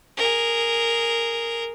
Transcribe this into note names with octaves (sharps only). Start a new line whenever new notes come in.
G#4 A#4